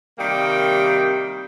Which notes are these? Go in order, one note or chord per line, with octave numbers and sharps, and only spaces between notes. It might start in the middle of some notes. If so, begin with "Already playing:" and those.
C3 D#3 G3 A#3 G5